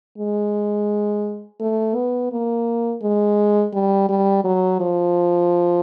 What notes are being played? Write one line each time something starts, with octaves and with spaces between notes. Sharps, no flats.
G#3
A3
B3
A#3
G#3
G3
G3
F#3
F3